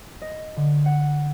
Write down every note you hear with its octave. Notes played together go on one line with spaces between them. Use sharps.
D#5
D3
F#5